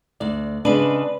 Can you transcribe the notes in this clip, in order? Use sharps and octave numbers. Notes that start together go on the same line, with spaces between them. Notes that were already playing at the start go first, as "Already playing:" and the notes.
D2 D5
C#3 G#3 D4 B4